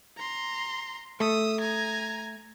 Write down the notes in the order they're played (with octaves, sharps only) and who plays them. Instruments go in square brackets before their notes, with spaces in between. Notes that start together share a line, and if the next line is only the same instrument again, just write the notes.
[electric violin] A#5 C6
[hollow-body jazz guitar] A3 [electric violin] D#6 E6
[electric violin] G#5 A#5